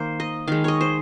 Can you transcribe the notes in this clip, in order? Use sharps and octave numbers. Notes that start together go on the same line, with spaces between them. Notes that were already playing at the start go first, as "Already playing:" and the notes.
Already playing: D#3 A#3 C5
D#5
D#3 G#3 F5
C#5 D#5
C5